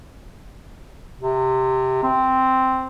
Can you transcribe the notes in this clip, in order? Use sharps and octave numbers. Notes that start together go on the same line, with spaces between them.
C3
C4